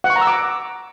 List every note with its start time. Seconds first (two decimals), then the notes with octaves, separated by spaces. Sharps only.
0.04 F#5
0.10 C#6
0.16 A#5
0.21 E6
0.27 D6